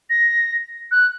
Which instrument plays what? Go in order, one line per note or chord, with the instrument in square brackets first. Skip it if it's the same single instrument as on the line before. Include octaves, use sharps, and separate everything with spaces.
[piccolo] A#6
F#6